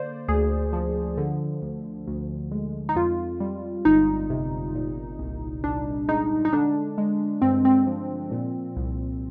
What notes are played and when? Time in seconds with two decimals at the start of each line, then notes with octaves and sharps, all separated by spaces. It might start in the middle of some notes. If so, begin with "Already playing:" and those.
Already playing: D3 A#3 C5 D5
0.28 D2 G#4
0.73 F3
1.18 D3
1.62 D2
2.07 D2
2.52 G#3
2.89 D#4
2.96 F2 F4
3.40 G3
3.85 G1 D#4
4.30 C3
4.75 A#2
5.19 C2
5.64 C2 D4
6.08 G#3 D#4
6.45 D#4
6.53 D3 D4
6.98 G#3
7.42 G2 C4
7.65 C4
7.87 F3
8.31 A#2
8.76 C2